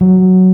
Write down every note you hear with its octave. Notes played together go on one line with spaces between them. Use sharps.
F#3